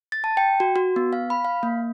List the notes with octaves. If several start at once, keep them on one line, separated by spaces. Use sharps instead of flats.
A6
A5
G5
F#4
F#4
B3
F5
B5
F5
A#3